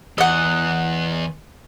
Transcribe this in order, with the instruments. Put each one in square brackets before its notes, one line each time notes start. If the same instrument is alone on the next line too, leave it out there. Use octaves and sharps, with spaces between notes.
[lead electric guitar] E2 [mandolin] D#5 F#5